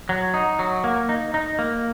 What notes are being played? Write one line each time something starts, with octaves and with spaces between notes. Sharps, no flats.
F#3
D#4
F#3
A#3
D#4
D#4
A#3